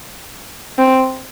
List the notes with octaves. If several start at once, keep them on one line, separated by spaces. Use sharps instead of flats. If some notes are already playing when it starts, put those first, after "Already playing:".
C4